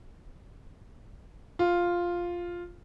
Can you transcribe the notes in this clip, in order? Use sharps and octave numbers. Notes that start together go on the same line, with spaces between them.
F4